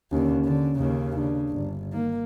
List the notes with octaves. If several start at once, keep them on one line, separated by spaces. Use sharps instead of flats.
D#2 D3 C#4
D3 C#4
D#2 C#3
C#3 D4
G1
D#3 A#3